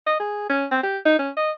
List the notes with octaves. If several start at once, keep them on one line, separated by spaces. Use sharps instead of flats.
D#5
G#4
C#4
C4
G4
D#4
C#4
D#5